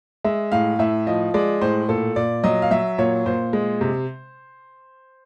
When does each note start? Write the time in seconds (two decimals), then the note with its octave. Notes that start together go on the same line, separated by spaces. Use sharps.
0.24 G#3 E5
0.52 A2 F5
0.79 A2 E5
1.07 F3 D#5
1.34 G#3 D5
1.61 A2 C5
1.89 A#2 A4
2.16 A#2 D5
2.44 F#3 D#5
2.62 F5
2.71 F#3 E5
2.98 A#2 C#5
3.26 A#2 C5
3.53 G#3
3.81 C3